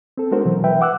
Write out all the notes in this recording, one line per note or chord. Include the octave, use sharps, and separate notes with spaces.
C4 A4
G#3 B3 D4 F#4 A#4 C5
B2 E3 F#3
B4 E5 G5
F#5 D6 E6 F#6